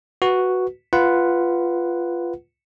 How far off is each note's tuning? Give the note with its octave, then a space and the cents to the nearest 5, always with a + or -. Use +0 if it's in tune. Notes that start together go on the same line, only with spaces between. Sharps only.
F#4 +0 B4 +0
F4 -10 B4 +0 F#5 +0